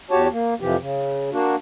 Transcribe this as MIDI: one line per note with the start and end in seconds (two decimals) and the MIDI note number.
0.11 0.28 40
0.11 0.28 66
0.11 0.28 67
0.11 0.28 73
0.11 0.28 81
0.32 0.54 58
0.60 0.76 41
0.60 0.76 48
0.60 0.76 52
0.60 0.76 53
0.60 0.76 67
0.80 1.30 49
1.32 1.56 58
1.32 1.56 62
1.32 1.56 66